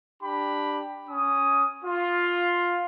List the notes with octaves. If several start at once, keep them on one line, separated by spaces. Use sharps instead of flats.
D4 G4 B5
C#4 D#6
F4